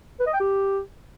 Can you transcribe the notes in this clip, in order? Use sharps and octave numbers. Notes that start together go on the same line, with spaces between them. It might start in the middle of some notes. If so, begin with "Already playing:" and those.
B4
D#5
G5
G4